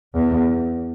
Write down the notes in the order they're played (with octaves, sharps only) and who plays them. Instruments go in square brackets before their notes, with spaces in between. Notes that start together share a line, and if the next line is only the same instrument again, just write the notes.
[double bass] E2